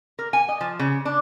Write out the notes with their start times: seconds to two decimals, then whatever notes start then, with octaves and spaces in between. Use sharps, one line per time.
0.19 A#4
0.33 G#5
0.49 D#5
0.61 F3
0.79 C#3
1.05 D4